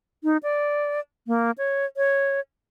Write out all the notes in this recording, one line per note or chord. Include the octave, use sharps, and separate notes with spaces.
D#4
D5
A#3
C#5
C#5